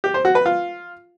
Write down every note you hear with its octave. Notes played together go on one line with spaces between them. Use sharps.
G4
C5
F#4
B4
F4